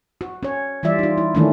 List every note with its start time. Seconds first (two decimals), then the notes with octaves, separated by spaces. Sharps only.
0.21 F#4
0.43 C#4 C#5
0.83 E3 G3 F4 D5 E5
0.99 D#4 F4
1.18 E4
1.35 D#3 E3 A3 A#3 C#4 D4